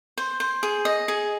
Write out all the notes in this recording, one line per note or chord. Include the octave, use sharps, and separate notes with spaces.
C5
C5
G#4
D#5
G#4